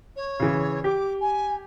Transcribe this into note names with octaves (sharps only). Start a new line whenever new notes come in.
C#5
C#3 E3
G4 D6
G#5